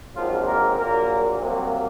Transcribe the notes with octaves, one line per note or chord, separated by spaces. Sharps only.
A#1 G#2 F3 F#3 C4 F4
A#3 A#4
A#1 A#2 F#3 A#3 A#4
C2 C3 F#3 A#3